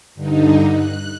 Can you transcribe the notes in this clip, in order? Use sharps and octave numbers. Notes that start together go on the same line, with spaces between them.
G2 D3 D#4
F#6